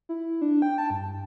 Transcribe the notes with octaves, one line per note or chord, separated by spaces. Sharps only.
E4
D4
G5
A5
G2